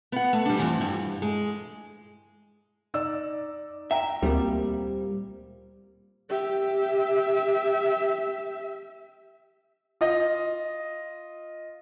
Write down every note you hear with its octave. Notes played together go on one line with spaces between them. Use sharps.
B3 F#5
A3
G3 D4
F2 E3 F3
G2
G#3
D#4 D5 E6
E5 G5 A#5
D2 A#2 G3 A#3 C4
G4 E5
F4 D#5